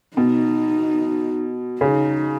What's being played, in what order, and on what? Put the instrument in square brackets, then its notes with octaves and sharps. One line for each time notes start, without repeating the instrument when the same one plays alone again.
[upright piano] B2 [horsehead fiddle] D#4
[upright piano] C#3 [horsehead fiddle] D#4